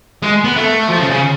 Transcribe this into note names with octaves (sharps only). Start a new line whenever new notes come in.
G#3
B3
A3
F3
C#3
C#3